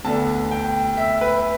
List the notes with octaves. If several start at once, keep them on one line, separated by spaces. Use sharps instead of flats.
D2 D3 B3 D4 A5
G5
E5
B4